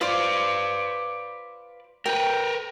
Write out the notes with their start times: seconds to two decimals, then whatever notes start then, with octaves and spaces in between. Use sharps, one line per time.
0.01 F4 B4 C5 D5 D6
2.06 A#4 B4 G5